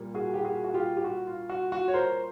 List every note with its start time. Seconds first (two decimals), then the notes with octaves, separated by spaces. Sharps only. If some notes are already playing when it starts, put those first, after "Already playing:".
Already playing: A#2 G3 A#3
0.15 F#4 G#4
0.34 G4
0.45 F#4 G#4
0.64 F#4
0.74 F4 G4
0.97 G4
1.04 F#4
1.27 F4
1.50 F#4
1.72 F#4
1.88 C#5
1.94 A#4 C5